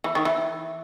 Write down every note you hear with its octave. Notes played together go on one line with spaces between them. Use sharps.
E3
D#3
E3